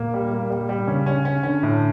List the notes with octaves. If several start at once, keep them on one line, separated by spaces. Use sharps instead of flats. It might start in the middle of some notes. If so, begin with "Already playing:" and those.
Already playing: A#2 A#3
G3
A#3
G3
G3
C#3 C#4
C#4
C#4
D3 C#4
A2